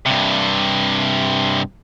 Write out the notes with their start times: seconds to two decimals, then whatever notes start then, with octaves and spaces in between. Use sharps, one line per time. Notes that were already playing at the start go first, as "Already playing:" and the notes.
0.06 G2 C3